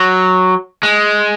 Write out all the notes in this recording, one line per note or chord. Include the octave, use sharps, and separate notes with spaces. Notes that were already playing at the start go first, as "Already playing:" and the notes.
Already playing: F#3
G#3